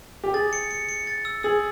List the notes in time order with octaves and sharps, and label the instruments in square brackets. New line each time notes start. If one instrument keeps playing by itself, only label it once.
[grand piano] G4
[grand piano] G#4 [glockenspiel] A6
[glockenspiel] C#7
C#7
C#7
A6
E6
[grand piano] G#4 [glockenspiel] E6